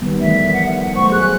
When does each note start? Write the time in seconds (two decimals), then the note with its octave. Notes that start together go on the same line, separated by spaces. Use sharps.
0.02 D#3 G3 B3
0.20 E3 F3 A3 E5
0.53 F#5
0.95 F#3 A3 C5 C#6
1.12 G#4 F#6